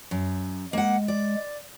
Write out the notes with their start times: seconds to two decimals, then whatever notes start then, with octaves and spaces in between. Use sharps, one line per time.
0.11 F#2
0.73 G#3 A#3 F#5
1.08 D5